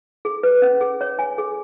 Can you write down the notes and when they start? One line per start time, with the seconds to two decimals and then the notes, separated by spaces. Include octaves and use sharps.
0.25 G#4
0.43 B4
0.62 C#4
0.81 G#4
1.01 C#5
1.19 G#5
1.38 G#4